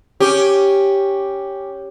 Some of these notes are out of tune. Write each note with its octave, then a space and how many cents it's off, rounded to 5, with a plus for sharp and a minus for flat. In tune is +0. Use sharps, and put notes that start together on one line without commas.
C#4 +0 G4 +0